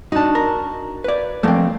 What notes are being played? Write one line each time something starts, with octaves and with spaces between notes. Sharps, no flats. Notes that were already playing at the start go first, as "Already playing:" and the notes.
D4 D#4 F#4 A5
A#4
B4 D5
F3 A3 A#3 C4 A4